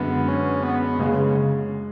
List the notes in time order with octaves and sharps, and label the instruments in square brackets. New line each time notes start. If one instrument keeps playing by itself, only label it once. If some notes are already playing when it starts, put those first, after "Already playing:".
Already playing: [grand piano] F#2 D3 G#3 [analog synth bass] B3
[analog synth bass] C#4
B3
[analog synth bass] C#3 [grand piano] G#3